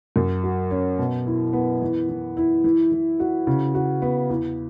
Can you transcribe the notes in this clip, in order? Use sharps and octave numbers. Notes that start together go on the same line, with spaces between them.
F#2
F#4
C#4
B2
E4
B3
E3
E3
E4
E3
E3
F#4
C#3
F#4
B3
E2